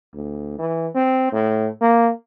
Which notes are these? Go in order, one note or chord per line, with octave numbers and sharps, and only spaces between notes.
D2
E3
C4
A2
A#3